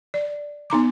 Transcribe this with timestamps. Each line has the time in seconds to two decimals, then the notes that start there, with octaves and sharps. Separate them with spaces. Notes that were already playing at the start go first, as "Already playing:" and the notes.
0.14 D5
0.70 B3 D#4 A#5 D6